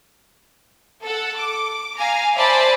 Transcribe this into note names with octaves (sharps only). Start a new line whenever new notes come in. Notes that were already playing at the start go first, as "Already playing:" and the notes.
A4 F#5
D6
F5 G#5 A#5
C5 D5 E5 G#5 A5 B5